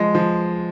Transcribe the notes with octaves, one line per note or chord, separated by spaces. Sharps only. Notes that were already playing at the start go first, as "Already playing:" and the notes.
Already playing: F3 G#3
F3